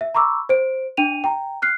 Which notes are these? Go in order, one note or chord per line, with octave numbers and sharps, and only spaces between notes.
E5
A#5 B5 C#6 D6 E6
C5 D7
D4 G5 D#7 F7
G5 A#5
F6 F#6 C7